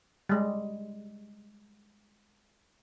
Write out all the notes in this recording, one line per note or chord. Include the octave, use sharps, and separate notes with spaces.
G3 G#3